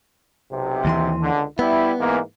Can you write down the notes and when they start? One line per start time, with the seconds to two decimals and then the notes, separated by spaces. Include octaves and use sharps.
0.52 B1 C3
0.85 D#2 E3 C6
1.22 C#2 D3
1.59 G3 B3 E4
1.99 G#2 E3 A#3